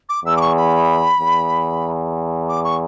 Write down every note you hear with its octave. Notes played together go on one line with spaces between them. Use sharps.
D6
E2 E6
D6
C#6
B5
E2
D6
C#6